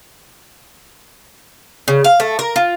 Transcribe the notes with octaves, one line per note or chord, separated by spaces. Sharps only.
C#3
F5
A3
A#4
F4